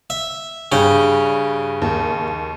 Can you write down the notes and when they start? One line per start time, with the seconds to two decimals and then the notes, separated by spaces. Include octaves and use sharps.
0.10 E5
0.72 G2 C#3 G5
1.82 D#2